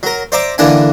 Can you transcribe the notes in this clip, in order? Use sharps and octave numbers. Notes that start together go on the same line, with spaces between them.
F#3 A#4
C5 D5 E5 A#5 D6
D3 E3 A#3 D4 F#5 G#5